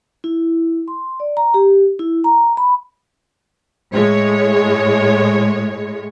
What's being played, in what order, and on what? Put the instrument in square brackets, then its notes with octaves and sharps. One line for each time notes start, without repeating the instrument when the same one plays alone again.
[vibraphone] E4
C6
D5
A#5
G4
E4
A#5
B5
[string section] A2 G#3 C#5